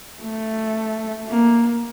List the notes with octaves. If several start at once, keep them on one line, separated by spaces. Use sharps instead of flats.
A3
A#3